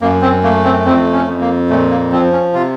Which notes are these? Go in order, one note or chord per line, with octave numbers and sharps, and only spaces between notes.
F#2 A#3
C4
A3 A#3
C4
F2 C4
C#4
F2
A#3
A#2 A3
A#3
F3 C4
C#4
C3 F4